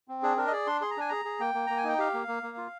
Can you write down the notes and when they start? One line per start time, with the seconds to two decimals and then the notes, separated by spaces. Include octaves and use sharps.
0.08 C4
0.23 D4 G#4
0.37 D4 A#4
0.47 D#5
0.52 G#4 D5
0.67 D4 C6
0.81 G#4 C6
0.91 A#5
0.97 D4 G#5
1.09 G#4 A#5
1.25 G#4
1.40 A#3 G5
1.55 A#3
1.67 A#3 A#5
1.77 G#5
1.84 D#4 G5
1.98 G4 F5
2.14 A#3
2.28 A#3
2.43 A#3
2.57 F4